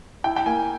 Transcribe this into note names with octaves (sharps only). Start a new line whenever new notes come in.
E4 G5
G5
A#3 G#5